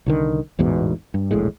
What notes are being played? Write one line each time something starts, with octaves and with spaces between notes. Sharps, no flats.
C2 D3 D#3
A1 E2 G#2 B2
G2
E1 A#1 A2 G#3